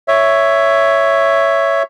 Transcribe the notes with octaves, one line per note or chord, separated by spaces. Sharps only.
C#5 E5